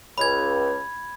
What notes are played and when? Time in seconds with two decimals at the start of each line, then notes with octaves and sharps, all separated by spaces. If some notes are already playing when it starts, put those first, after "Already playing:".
0.18 C#2 B5 G#6